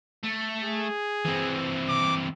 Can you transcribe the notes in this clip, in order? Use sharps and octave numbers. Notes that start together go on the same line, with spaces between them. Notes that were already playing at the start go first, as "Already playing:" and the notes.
A3
G#4
E3 C4
D6